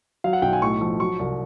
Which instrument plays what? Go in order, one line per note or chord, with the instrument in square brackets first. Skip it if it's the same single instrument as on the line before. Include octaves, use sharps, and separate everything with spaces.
[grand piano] F#3 F5
F#5
B1 G5
G#5
A2 C#6
F3
F#3 C#6
C2